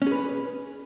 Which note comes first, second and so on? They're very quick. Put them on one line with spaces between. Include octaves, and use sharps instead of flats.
C#4 G#4 B4